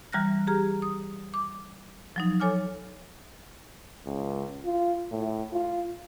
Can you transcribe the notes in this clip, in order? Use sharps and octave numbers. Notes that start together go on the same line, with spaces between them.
E3 G3 A#5 F6 F#6 A#6
G4 G#4 A#5 F6
D#6
D6
F3 F#3 D#4
A4 C#5 G#5 D6 F6
C#2
F4
A2
F4